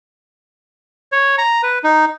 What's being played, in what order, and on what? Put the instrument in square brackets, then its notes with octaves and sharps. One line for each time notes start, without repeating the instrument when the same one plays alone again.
[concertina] C#5
A#5
B4
D#4